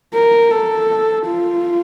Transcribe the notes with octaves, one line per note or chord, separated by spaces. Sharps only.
A#4
A4
F4